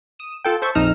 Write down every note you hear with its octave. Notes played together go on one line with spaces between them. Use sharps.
D#6 D#7 E7
F4 A4 G5
A4 C5 E5 C#6
A#1 F2 D#4 E6 F6 A#6